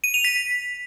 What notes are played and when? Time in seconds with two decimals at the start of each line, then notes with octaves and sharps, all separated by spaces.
0.04 D#7
0.14 F7
0.24 B6